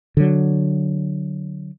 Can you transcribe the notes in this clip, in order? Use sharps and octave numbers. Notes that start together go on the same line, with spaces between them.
D3 F#3